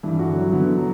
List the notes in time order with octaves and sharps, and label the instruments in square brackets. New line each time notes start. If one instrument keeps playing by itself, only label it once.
[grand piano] G2 [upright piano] E3
[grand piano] F#4
[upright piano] D3
[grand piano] F#3
[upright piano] D3 [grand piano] B3
[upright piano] F#3